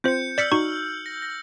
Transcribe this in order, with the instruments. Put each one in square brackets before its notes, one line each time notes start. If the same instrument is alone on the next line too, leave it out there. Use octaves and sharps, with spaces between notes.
[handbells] C4 F4 C5 [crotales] G6 C#7
[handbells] D5 B6 C#7 [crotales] E6 F6 F#7
[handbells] D#4 F#4 C#6
[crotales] A#6
A#6